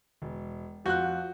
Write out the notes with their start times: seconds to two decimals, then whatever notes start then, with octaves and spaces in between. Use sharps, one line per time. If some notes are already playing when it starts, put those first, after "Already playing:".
0.22 E1
0.86 F2 F4 F#4 F#6 G6